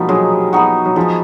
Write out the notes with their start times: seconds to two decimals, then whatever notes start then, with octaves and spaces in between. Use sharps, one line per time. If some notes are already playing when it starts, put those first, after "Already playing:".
Already playing: F3 G3 A#3 B3 D#4 F#4
0.09 F#3 G#3
0.53 B3 D#4 F#4
0.86 F#3
0.96 F3 G#3